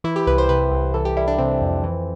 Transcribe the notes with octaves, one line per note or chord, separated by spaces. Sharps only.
E3 E4
G4
C2 B4
C5
C3 B4
C2
E3 A4
G4
G3 E4
D4
C3 C4
F2
E3